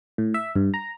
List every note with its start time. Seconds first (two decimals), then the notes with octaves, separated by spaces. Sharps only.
0.18 A2
0.34 E5
0.56 G2
0.74 A#5